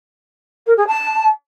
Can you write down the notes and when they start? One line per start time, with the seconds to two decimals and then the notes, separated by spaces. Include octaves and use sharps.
0.67 A#4
0.77 G#4
0.87 A5